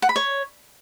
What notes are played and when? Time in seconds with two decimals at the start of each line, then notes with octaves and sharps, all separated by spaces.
0.02 F#5
0.09 B5
0.16 C#5